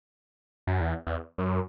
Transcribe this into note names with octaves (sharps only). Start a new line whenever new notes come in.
F#2
E2
E2
F#2